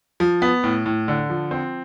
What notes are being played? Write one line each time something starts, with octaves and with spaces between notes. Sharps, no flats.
F3
B3
A2
A2
D3
F3
C4